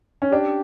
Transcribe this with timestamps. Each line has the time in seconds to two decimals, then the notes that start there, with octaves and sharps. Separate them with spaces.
0.22 C#4
0.32 D4 G4